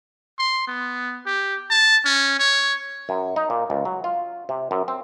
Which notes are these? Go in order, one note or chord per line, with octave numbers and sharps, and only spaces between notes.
C6
B3
G4
A5
C#4
C#5
F#2
D#4
A#2
C#2
F#3
F4
C3
F#2
C4